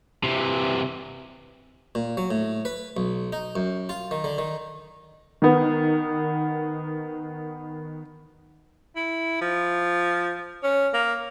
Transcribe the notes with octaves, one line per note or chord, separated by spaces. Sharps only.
C3 E3
A#2
F#3
A2
B4
B1
D#4
F#2
F4
D#3
D3
D#3
D#3 B3
E4
F3
C#4
A#3